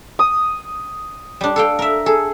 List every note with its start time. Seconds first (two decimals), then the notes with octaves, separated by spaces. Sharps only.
0.19 D#6
1.41 G3 D4
1.56 A4 F5 G5
1.79 A#4 E5
2.06 G#4 A4